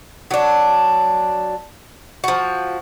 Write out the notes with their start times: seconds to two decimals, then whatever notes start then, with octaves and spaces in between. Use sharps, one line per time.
0.31 F#3 D4
2.24 F3 F#4